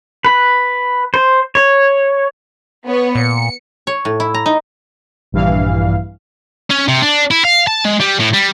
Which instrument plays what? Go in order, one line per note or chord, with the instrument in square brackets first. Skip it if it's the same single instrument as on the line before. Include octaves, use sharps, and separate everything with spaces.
[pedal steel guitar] B4
C5
C#5
[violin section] B3 C#5
[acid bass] A#2 [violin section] C#7
[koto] C#5
A2
E4
A#5
D#4
[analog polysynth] A#1 G2 E3 F5
[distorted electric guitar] C#4
C3
D4
E4
F5
A5
G#3
G3
A2
G3